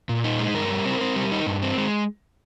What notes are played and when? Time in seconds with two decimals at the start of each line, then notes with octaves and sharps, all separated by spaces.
0.09 A#2
0.24 D#4
0.39 G#3
0.54 G2 A#4
0.70 G3
0.86 C4
1.01 C4
1.16 G3
1.32 D#4
1.47 G2
1.62 C4
1.78 G#3